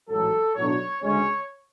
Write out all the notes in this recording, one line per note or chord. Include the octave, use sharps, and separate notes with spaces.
A1 G#2 F#3 A4
B1 A2 F#3 B3 D4 C#5
D2 C#3 G#3 C#4 C#5